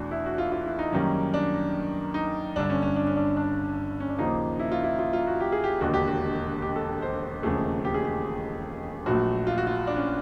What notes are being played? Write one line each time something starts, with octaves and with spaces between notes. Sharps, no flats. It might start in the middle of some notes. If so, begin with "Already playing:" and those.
Already playing: E2 B2 A3 D4
E4
F#4
F4
F4
E4
D#4
F#2 D#3 G3 A#3 C#4
D4
D#4
G1 G2 D3 D4
C#4
C#4
D4
C#4
D4
D4
C#4
D4
D#2 C#3 F3 A#3 D#4
E4
F4
E4
F4
F4
F#4
G4
G#4
G4
E1 D#2 D3 F#4
G4
F#4
G4
A4
C5
E1 D#2 C#3 F3 A3 G#4
G4
G#4
G4
A#1 A#2 F#3 A3 F#4
F4
F#4
F4
D4
C#4